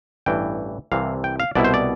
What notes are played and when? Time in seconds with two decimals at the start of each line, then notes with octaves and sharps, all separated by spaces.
0.26 A1 G2 E3 G5
0.92 C2 C3 E3 F5
1.24 G5
1.40 F5
1.55 C2 B2 B3 E4 D5
1.64 C5
1.74 D5